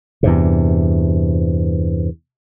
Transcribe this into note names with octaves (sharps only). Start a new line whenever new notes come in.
E2 G2 C3